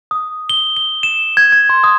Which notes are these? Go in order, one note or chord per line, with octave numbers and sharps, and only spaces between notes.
D#6
G7
G7
E7
G#6
G#6
C6
D#6